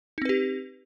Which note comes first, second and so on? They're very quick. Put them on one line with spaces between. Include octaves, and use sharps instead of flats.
D#4 C4 B4 G4